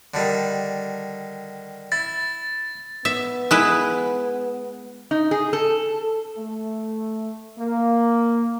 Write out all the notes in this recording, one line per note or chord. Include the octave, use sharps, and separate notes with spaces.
D3 D#3 G3
E4 A6
B3 E5
G#3 E4 B4
D#4
G#4
A4
A3
A#3